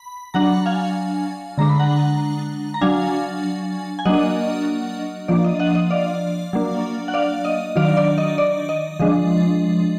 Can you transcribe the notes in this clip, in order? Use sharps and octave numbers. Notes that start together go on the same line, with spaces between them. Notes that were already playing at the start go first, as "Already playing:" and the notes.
Already playing: B5
F#3 D4 F#5 A#5
F5 G#5
D3 G#3 D4 A#5
B5
F#5 A#5
A#5
F#3 D4 F5 G#5
G#5
F#3 A#3 D4 D#5 F#5
F3 A#3 D4 D5
D#5
D#5 F#5
D#5
D5 F5
F#3 A#3 D4
F#5
D5 F5
D#5
D#3 F#3 D4 D5 F5
D5
D#5
D5
D#5
F3 G#3 D4 D#5